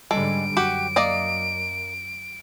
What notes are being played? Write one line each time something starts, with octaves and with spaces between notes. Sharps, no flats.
G#2 D3 G3 G#3 A4 D7
F#2 F#4 G4
A#3 D5 D#5